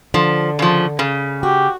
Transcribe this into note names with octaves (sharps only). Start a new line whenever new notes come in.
D3 F3
C#3 F3
C#3
F#4 G4